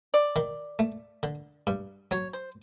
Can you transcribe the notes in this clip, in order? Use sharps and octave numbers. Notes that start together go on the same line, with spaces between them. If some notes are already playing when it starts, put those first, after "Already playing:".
D5
D#3
A3
D3
G2
F#3 C#5
C5